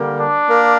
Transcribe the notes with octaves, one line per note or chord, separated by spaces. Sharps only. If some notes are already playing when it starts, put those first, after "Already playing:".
Already playing: D3 G3 A#3
D4
A#3